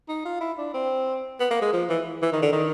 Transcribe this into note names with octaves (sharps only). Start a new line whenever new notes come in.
D#4
F4
E4
D4
C4
B3
A#3
G#3
F3
E3
E3
D#3
D3
D#3